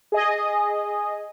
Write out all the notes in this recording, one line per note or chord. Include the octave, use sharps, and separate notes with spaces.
G#4 D#5